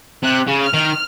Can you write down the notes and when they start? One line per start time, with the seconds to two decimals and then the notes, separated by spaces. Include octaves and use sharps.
0.23 C3 F#6
0.48 C#3
0.61 F6
0.74 D#3